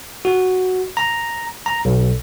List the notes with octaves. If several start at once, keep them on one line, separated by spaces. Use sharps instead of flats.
F#4
A#5
A#5
B1